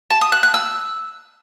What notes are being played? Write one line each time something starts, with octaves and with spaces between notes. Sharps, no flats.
A5
D#6
F#6
F#6
E6